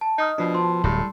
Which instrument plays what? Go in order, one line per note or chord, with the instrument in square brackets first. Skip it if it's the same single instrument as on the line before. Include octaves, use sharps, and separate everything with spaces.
[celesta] A5
[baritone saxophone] D#4 [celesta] D#5 D#6 F6
[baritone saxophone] B2 [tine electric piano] F3 D4
[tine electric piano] F3 [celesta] A5 C6
[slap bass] D1 [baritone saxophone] A2 [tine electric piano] G3